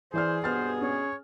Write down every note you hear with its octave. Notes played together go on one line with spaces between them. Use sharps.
E3 G#4 C5 D5 F6
G2 B2 B3 C5 F6 A6
C#4 C#5